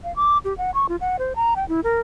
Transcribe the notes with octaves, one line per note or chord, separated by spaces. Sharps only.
F5
D6
G4
F#5
C#6
F4
F#5
C5
A#5
G5
E4
A#4